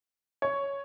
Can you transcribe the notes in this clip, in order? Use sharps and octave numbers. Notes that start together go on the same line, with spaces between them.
C#5